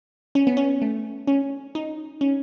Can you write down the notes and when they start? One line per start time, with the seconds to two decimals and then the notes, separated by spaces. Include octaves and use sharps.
0.35 C#4
0.47 B3
0.57 C#4
0.82 A3
1.27 C#4
1.75 D#4
2.21 C#4